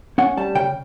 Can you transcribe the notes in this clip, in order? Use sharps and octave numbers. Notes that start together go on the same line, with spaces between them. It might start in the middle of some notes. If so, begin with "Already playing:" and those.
C#4 F#5
G3 A5
C#3 G5